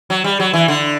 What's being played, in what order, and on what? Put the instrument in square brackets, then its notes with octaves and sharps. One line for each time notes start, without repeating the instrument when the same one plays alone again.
[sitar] F#3
G3
F#3
E3
D3